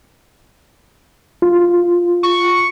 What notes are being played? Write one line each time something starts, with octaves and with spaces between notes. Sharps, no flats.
F4
C#6